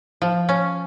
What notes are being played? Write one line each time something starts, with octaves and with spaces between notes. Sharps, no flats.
F3
C#4